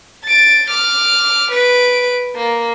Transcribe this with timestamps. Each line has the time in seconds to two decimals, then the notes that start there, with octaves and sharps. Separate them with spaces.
0.24 A6 D7
0.69 D6 F6
1.51 B4 D7
2.35 A#3